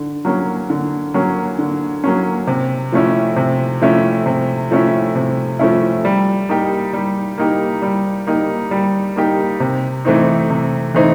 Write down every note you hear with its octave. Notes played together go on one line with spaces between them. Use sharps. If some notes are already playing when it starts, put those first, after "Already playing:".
Already playing: D3
F#3 A#3 C#4
D3
F#3 A#3 C#4
D3
F#3 A#3 C#4
C3
F3 A3 C#4 E4
C3
F3 A3 C#4 E4
C3
F3 A3 C#4 E4
C3
F3 A3 C#4 E4
G3
A#3 D#4 G4
G3
A#3 D#4 G4
G3
A#3 D#4 G4
G3
A#3 D#4 G4
C3
E3 A3 C4 D#4
C3
E3 A3 C4 D#4